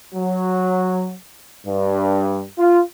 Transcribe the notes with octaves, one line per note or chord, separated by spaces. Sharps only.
F#3
G2
F4